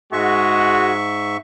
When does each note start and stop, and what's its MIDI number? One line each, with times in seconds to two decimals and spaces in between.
0.13 1.37 44
0.13 0.94 56
0.13 0.94 66
0.13 1.37 76
0.13 1.37 85